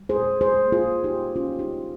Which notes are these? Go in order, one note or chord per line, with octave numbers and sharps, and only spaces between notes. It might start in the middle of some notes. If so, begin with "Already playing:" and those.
Already playing: G3
G#4 C5
A#2
A#2 G#4 C5
A#3
F4 G#4
G3
D#4 G4
A#2
G#3 C#4 F4
D#3 D#4 G4